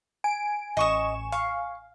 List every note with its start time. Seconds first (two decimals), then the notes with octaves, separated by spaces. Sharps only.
0.24 G#5 D7
0.77 A1 D#5 C#6 D#6 E7
1.32 F5 C#6